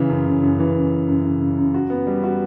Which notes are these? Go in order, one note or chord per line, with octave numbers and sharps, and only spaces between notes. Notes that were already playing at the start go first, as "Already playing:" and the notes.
Already playing: C#3 E3
F#2
C#3
F#2
E3
F#2
F#2
F#2
C#3
C#3
F#2
F#4
B3
G3
F#4